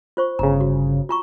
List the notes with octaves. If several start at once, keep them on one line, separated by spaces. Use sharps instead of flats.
F4 C5 C#6
G1 C#3 A#5
F#4
F4 A#5 C#6